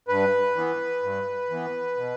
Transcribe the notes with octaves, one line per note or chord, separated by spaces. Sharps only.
G2 B4
E3 B3
G2
E3 B3
B2